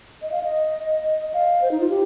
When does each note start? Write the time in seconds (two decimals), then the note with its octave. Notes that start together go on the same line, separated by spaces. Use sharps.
0.22 D#5
0.32 F5
0.43 D#5
1.34 F5
1.62 C5
1.71 D#4
1.80 F4
1.90 G4